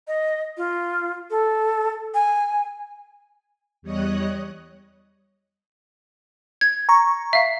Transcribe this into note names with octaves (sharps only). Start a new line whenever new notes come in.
D#5
F4
A4
G#5
E2 G3 C#5 D#5 D#6 F#6
G#6
A#5 C#6
E5 F5